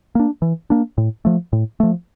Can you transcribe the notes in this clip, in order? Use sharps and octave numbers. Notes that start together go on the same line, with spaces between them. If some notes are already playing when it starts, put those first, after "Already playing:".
A#3 D4
E3
A#3 D4
A2
F3 A3
A2
F3 A3